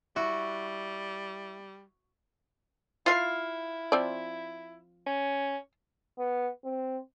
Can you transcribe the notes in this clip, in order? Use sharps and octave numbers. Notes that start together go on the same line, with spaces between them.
G3 E4 F#4
E4 F4 F5
F3 C4 D5
C#4
B3
C4